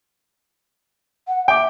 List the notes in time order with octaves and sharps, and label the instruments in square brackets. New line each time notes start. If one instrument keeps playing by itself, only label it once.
[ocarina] F#5
[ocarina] E5 [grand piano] G5 D6